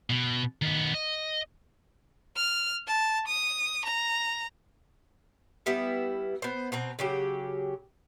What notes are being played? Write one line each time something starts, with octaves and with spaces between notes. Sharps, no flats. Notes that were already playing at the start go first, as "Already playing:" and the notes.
B2
D#3 B3
D#5
F6
A5
D#6
A#5
G3 B3 E4 E5
B3 C5
B2 C4 A#5
C#3 F#3 G4